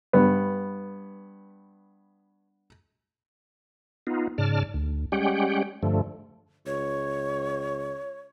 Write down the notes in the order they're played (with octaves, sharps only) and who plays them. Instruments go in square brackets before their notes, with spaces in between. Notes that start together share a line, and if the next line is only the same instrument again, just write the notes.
[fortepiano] G2 B3
[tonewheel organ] B3 D#4 F4
G#2 C#3 D5 A5 F6
D2
G3 G#3 C#4 G4 F#5 G5
G2 D3 F3 A3
[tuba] C#2 [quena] C#5